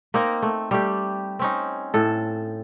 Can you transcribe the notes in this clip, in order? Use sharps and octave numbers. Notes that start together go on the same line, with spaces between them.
A#3 C4 D#4 A#4
A3
G3 A3 G4
C4 C#4 D#4
A2 A4